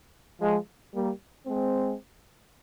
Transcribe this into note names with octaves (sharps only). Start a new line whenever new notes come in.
F3 G#3
G3 A#3
G#3 C4